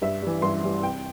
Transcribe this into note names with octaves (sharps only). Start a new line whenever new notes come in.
G2 E5
E3 G3
G2 C6
E3 G3
C3 G5